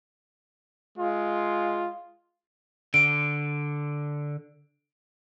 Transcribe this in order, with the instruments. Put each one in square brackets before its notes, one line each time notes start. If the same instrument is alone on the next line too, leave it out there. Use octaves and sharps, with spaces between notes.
[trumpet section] G#3 F4
[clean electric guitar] D3 [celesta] D7